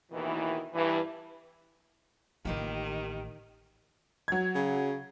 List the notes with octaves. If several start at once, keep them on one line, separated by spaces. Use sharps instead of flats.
D#2 B2 D#3 E3
G2 E3
A1 D#3 A#3 F4 G4 B4
F#3 G#6
C#3